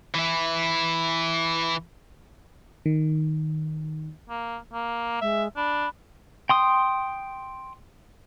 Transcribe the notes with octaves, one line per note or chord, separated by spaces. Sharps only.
E3 E4
D#3
A#3
A#3
G#3 E5
D4 B5
G5 C6 D#6